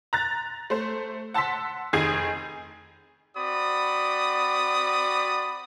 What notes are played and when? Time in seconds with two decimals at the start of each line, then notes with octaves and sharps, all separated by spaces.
0.13 A#5 F#6 A6
0.70 A3 C5
1.34 F#5 A5 C6 E6 B6
1.93 F1 D#3 G#4 G#5 D#6 C7
3.37 C4 F#4 D5 B5 D#6